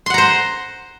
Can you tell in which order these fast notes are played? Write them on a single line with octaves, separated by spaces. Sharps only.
C6 F#5 A#5 C5